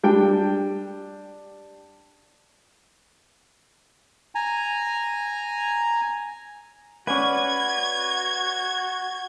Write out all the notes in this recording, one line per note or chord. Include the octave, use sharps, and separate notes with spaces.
G3 D4 G5
G#5 A#5
C#4 F#4 B4 D5 F#5 G#5 G#6